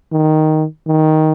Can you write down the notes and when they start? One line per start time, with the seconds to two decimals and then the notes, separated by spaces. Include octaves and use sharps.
0.12 D#3
0.87 D#3